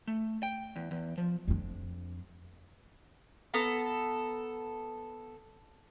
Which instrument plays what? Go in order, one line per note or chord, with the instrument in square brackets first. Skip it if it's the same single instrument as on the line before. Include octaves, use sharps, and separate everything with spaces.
[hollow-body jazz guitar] A3
G5
E2
E2
F3
[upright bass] F2 D4
[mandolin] B3 A4 A#5